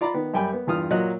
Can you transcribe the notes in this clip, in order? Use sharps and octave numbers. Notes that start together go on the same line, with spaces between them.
F4 D5 A#5 B5 D6
D#3 B3
F#2 G3 G5 G#5 B5
B3
E2 G2 F4 D#6 F6
A#2 F#3 F4 D#5 F#6